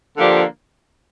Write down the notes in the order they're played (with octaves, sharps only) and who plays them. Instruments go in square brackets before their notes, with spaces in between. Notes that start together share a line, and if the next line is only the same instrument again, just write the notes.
[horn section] D3 F3 A#3 D4 G4